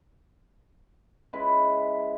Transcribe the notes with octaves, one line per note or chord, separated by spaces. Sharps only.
C#3 G#3 E4 B4